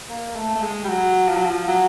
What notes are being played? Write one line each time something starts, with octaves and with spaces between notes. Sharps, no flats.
A#3
A3
A3
G#3
G3
F#3
F3
F#3
F3
F#3